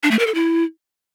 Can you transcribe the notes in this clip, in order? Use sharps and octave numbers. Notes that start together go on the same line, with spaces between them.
D4
A3
A#4
A4
E4